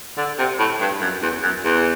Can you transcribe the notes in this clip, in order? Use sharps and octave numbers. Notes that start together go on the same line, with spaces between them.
D3
C3
A2
G2
F#2
E2
F#2
E2